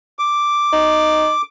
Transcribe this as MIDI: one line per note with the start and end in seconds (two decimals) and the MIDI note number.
0.19 1.42 86
0.73 1.31 63